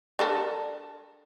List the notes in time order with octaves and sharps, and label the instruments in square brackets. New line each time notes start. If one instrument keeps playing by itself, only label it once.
[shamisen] D4 A4 A#4